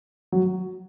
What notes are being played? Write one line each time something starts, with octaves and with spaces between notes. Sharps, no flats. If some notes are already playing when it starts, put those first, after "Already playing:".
F#3